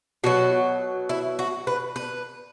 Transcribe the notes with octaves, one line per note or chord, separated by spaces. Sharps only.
B2 F#3 F#4
E4
F#4
B4
B4